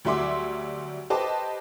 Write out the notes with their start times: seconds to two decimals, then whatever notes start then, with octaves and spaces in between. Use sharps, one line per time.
0.05 D2 F#3 G3 E5 C6 D6
1.10 G4 B4 C5 D#5 A5 D6